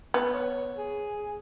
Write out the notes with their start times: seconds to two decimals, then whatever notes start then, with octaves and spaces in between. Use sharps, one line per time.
0.14 B3
0.33 C#5
0.76 G#4